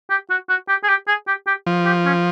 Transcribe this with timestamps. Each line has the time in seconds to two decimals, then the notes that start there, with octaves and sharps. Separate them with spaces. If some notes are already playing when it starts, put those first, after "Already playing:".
0.10 G4
0.30 F#4
0.49 F#4
0.68 G4
0.83 G#4
0.89 G4
1.08 G#4
1.27 G4
1.47 G4
1.66 F3
1.85 G4
2.05 C#4